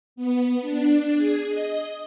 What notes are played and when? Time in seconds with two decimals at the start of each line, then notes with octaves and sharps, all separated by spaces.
0.16 B3
0.61 D4
1.16 G#4
1.48 D#5